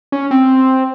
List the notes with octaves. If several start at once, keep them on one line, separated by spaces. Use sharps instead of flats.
C#4
C4